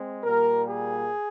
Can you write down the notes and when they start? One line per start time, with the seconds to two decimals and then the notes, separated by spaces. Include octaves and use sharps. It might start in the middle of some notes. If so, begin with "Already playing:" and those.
Already playing: G#3 C4
0.24 A#2 G3 A#3 A#4
0.68 G#4